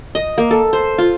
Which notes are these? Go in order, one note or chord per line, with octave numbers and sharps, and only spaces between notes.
D#5
A#3
A4
C5
F4